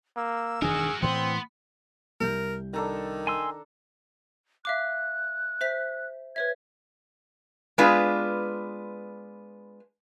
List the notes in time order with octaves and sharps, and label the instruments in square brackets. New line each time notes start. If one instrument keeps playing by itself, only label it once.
[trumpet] A#3 [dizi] E6
[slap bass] E1 D#3 D4 [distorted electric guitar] F#4 A#4 [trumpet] G#4
[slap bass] A2 E3 [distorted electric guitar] B3 [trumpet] C4 [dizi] C6
[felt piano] C2 G6 [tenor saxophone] A#4
[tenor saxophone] D#3 [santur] D4 A4 A#5
[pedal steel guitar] G#5 C6 E6
[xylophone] E5 F5 D6 [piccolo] F#6
[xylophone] C5 E5 B6
[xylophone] B4 C#5 E5 [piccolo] G#6
[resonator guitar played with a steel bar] G#3 B3 D4 F4 B4